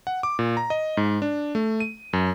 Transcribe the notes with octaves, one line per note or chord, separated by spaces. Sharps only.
F#5
D6
A#2
A#5
D#5
G#2
D4
A3
D#7
F#2